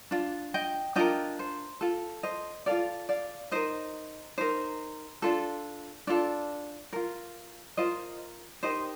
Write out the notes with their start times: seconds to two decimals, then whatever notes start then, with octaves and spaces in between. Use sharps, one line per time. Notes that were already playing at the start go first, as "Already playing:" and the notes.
0.11 D4 F4
0.54 D#5 G5
0.96 D4 F4 A#4 D#5 G5
1.39 C5
1.81 F4 A4
2.23 C5 D#5
2.66 F4 A4 D5 F5
3.09 D5 F5
3.51 D#4 A#4 C5 D#5
4.38 D#4 A#4 C5
5.22 D4 F4 A4
6.07 D4 F4 A4 D5
6.93 F4 A#4
7.77 F4 A#4 C5 D#5
8.63 D#4 G4 A#4 C5 D#5